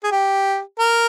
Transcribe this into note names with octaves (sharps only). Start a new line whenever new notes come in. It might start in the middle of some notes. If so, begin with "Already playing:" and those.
G#4
G4
A#4